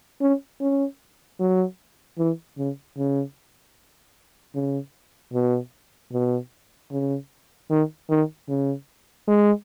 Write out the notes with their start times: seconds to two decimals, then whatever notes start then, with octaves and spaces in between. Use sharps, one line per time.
0.21 C#4
0.61 C#4
1.40 F#3
2.18 E3
2.58 C#3
2.97 C#3
4.55 C#3
5.33 B2
6.13 B2
6.91 C#3
7.70 D#3
8.10 D#3
8.49 C#3
9.28 G#3